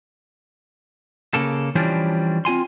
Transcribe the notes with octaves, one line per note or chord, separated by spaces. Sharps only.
C#3 A#3 A4
E3 F3 G3 C#4 D4
C4 F4 G#5 C6